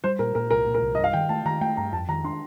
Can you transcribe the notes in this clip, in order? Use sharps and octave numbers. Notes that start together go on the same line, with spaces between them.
G3 C5
A#2 A#4
A#2 A#4
C2 A#4
A#2
A#4
C2
G2 D#5
F5
D#3 G5
A3 A5
D#3 A#5
A3 G5
G2 A#5
F2 A5
D#3 A#5
D4 C6